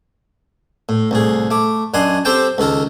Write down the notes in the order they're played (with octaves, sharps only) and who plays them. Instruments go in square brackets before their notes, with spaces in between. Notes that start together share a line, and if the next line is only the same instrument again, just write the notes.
[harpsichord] A2
C2 A2 G#4
A3 D6
F#2 D4 D#5 G#5 C6
C4 G4 A4 C5 G5 A5
C#2 D#3 A4 A#4